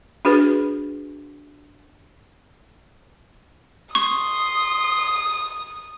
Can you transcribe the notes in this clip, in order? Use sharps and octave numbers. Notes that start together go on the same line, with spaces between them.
D4 F#4 G#4 B4
C6 C#6 D#6